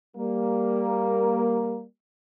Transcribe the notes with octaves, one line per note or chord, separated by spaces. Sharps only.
G3 A#3